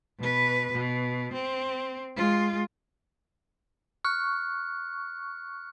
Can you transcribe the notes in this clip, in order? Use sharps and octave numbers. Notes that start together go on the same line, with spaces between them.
B2 B4
B2
C4
G#3 F4
C#6 F6 F#6